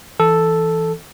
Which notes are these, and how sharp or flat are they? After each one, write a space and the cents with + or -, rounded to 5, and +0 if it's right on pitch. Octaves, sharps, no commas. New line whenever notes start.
E3 +0 A4 +0